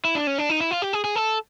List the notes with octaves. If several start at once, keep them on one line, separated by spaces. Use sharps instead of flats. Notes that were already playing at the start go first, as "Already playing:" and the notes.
E4
D4
C#4
D4
D#4
E4
F4
G4
G#4
G#4
A4